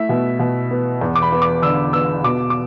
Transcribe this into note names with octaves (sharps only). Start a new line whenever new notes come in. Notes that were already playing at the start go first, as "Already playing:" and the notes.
Already playing: A3 E4 E5
B2
B2
B3
E2
D6
B5
B3
D6
D3 E6
B3 E6
B2 D6
D6